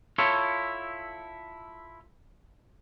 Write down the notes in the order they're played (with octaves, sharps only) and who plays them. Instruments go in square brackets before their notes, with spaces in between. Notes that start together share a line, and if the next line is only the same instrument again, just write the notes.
[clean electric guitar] E4 F4 A4 C#5